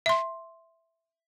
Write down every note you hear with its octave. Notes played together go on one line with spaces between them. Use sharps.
E5 C6